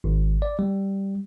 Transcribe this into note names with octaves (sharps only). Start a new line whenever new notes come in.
G#1
D5
G3